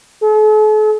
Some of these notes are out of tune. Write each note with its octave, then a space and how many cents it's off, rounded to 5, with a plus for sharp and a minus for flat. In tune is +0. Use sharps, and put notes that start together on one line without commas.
A4 -45